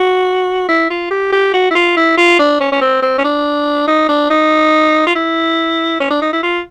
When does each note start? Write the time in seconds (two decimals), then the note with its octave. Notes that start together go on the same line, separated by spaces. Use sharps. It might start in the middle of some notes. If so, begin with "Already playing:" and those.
Already playing: F#4
0.68 E4
0.90 F4
1.11 G4
1.33 G4
1.54 F#4
1.71 E4
1.75 F4
1.97 E4
2.17 F4
2.39 D4
2.60 C#4
2.72 C#4
2.81 C4
3.02 C4
3.18 C#4
3.24 D4
3.87 D#4
4.09 D4
4.30 D#4
5.07 F4
5.16 E4
6.00 C#4
6.10 D4
6.22 D#4
6.33 E4
6.43 F4